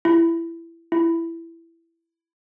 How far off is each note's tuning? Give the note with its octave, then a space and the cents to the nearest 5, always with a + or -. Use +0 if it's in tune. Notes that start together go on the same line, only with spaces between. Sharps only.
E4 +20
E4 +15